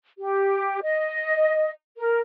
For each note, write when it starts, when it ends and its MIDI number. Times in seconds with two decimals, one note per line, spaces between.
0.19 0.81 67
0.82 1.70 75
1.98 2.20 70